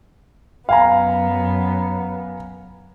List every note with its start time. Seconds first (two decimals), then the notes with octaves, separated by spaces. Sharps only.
0.69 F#2 B3 F5 G#5 A#5